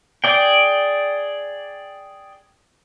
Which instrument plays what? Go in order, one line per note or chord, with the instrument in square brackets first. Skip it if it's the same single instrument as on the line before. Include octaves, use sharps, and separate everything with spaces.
[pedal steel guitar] G#4 D5 G5